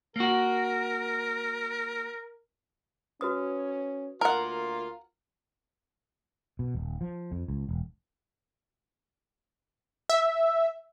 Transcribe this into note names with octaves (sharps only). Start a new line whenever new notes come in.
A#3 F#4 A#4
C#4 F#4 B4 D#6
D2 A#3 F4 A#4 F#5
B2
D#1
F3
F2
C#2
E1
E5